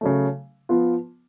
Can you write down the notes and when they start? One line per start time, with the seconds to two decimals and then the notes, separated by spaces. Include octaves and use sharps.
0.01 C#3 F#3 A3
0.69 F3 B3 F4